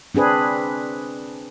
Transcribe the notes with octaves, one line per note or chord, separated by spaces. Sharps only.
C4 D4 G#4 B4